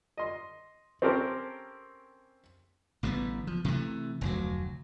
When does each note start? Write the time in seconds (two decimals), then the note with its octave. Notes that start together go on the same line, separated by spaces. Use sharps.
0.17 D#5 C6
1.02 C4 C#4 G4 A4 A#4 C5
3.03 A1 D3 G3 B3
3.47 F3
3.65 C3 E3 A3
4.21 F1 D2 F#3